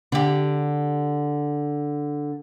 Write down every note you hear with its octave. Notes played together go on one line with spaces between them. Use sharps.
D3 G4